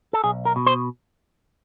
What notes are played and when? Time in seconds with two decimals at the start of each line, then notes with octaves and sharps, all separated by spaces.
0.13 A4
0.24 B1 G#4
0.45 A#4
0.56 B2
0.67 C5